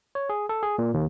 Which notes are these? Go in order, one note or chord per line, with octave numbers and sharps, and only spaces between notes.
C#5
G#4
A4
G#4
A#2
D#2